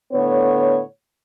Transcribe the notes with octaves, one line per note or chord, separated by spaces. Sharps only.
A2 D3 B3 C#5